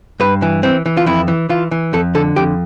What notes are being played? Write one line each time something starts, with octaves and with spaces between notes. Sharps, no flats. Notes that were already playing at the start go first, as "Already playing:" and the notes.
G2 B4
E3
E3 C4
E3
F4
F2 E4
E3
E3 F4
E3
F2 A4
D3 A4
F2 G4